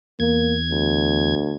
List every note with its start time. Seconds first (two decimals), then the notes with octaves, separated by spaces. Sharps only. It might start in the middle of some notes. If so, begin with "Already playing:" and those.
0.20 E2 A#3 G#6
0.71 D2